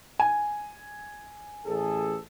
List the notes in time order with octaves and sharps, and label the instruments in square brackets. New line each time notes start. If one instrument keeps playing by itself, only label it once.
[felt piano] G#5
[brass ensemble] A1 G#4 A4